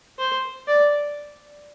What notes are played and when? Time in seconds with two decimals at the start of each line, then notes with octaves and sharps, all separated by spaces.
0.19 C5
0.68 D5